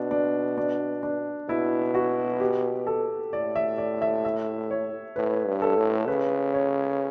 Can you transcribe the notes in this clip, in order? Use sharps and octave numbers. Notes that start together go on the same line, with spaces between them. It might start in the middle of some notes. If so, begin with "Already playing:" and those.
Already playing: B2 D4
D4
D4
D4
B2 E4
F#4
G4
A4
A2 D5
E5
D5
E5
E5
C#5
A2 B4
G2
A4
A2
C#3 B4
C#5